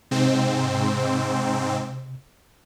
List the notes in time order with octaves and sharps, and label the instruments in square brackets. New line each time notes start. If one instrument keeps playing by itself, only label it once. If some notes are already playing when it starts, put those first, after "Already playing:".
[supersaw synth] G#2 C4 [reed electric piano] C3